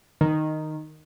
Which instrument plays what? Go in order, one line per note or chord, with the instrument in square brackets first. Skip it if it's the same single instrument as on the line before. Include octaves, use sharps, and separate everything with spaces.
[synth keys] D#3